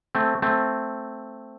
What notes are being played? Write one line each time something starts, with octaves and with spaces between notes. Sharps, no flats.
A3 C4
A3 C4